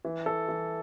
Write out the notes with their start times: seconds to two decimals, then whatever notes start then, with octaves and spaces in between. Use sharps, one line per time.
0.05 E3
0.26 A4
0.48 E3